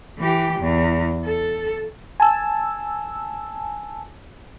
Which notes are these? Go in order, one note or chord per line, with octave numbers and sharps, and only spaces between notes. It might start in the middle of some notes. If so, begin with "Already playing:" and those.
E3 G4
E2
A4
G#5 A5 E6